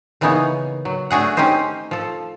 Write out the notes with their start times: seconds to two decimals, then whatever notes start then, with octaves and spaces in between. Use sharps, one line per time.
0.21 C#3 E3 A#3 B3 D#4 C#5
0.85 F#3
1.10 A3 D4 F#4 G#4 F#5
1.37 C4 C#4 D#4 G4 C5 D#5
1.91 F3 A4